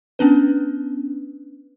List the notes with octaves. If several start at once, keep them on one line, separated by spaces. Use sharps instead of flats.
B3 C#4 D4 B4